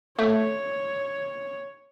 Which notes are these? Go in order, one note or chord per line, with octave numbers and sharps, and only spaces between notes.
A3 C#5